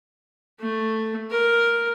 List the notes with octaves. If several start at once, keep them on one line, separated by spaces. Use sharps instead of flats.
A3
A#4